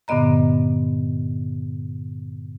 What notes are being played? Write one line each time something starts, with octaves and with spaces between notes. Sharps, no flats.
G2 A#2 D3 B3 D#5 A#5